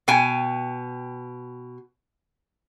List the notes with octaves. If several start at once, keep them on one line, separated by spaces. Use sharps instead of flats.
B2 G5 G#5